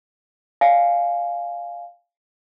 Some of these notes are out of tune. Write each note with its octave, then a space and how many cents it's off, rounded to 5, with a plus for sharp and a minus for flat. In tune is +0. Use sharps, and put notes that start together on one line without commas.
D5 +0 F5 +0 G#5 +15